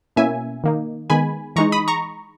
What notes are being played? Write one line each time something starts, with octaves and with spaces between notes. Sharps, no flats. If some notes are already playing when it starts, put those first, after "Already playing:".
B2 A#3 C#4 E4 E5 G#5
D#3 A#3 D#4
D#3 G#3 B3 G#5 B5
E3 G#3 D#4 A#5 C#6
B5 D#6
A#5 C#6